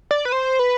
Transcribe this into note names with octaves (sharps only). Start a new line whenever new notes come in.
D5
B4
C5
B4